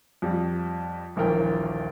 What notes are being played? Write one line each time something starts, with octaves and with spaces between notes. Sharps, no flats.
F2 G3
D#1 A#1 E3 A#4 G5